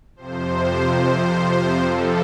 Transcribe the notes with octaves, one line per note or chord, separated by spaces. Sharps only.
F2 C3 F3 C5
F2 C3 F3 A4